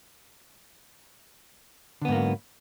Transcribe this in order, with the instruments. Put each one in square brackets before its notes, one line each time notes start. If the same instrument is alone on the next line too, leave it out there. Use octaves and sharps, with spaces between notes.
[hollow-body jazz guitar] D3
B3
G#2
A#3
F#3